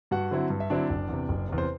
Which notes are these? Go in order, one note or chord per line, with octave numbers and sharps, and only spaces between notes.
G2 F#4 F#5
D3 F#3 C4 E4
G2
E5
D3 F#3 C4 D4 E4 D5
F#1
E2 C3
F#1
E2 C3
C5